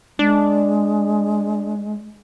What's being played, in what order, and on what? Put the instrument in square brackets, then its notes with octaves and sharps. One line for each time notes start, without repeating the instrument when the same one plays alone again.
[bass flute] G#3 [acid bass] D4